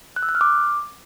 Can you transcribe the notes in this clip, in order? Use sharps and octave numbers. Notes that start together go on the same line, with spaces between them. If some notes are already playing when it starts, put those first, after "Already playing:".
F#6
E6
F#6
F6
D6